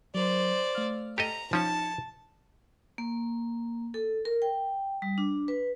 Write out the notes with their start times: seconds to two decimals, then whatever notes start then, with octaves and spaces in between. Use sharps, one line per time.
0.15 F#3 A#4 C5 D5
0.75 A3 F5 F6
1.18 G4 A4 D#5 A#5
1.53 F3 C#4 D#4 A5 G#6 C#7
2.98 A#3
3.94 A4
4.25 A#4
4.42 G5
5.02 G3
5.18 D4
5.48 B4